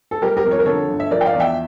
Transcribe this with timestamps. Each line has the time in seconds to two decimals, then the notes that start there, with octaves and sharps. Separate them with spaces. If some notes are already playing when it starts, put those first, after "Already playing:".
0.11 A4
0.22 G3 G4 A#4
0.37 G4 A#4
0.45 F2
0.51 C#5
0.59 A#4
0.66 D3 A4 C#5
0.89 G1
1.00 E5
1.10 F3 A#4 D5
1.21 G5
1.26 D5 F5
1.33 E2
1.40 E5 G5